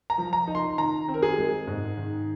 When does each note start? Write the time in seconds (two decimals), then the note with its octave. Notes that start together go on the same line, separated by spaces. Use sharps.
0.10 A#5
0.18 F3
0.33 A#5
0.47 D#4
0.55 C6
0.78 D#3 A#5
1.08 C4
1.14 A#4
1.23 G#4
1.38 G#3
1.67 G#2
1.97 D#3